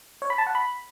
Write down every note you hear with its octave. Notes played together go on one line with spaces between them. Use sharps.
C#5
B5
A5
F#5
B5